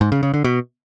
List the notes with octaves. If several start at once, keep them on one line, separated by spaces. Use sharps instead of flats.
G#2
C#3
C#3
D3
B2